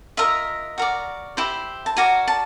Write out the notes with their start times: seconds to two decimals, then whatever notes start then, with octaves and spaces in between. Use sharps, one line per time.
0.17 F4 A#4 D#5 E5
0.78 F#4 A#4 D5
1.37 E4 G4 C5
1.86 A5
1.97 F#4 A#4 D5 G#5
2.28 A5